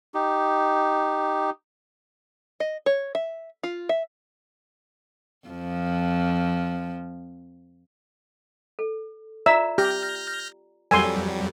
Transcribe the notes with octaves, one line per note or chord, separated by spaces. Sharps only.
D#4 G4
D#5
C#5
E5
F4
E5
F2 F3
A4
F4 D5 E5 A#5 E6
G4 F6 G6 A#6
F2 F#3 G3 A4 A#4 F#5 G#5 C6